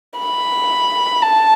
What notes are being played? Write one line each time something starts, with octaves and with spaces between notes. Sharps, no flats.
B5
A5